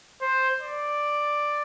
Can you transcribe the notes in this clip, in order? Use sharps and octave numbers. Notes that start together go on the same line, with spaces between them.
C5
D5